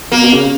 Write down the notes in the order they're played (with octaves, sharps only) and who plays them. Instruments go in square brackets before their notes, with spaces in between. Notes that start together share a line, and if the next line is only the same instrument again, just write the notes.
[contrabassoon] B2 [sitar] A#3
[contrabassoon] B2
C#3